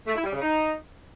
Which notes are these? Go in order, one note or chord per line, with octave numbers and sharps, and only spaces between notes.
A3
E4
G3
C#3
D#4